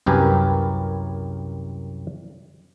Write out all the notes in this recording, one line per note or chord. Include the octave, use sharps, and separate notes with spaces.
C2 F#2 G4 A#4 B4 G#5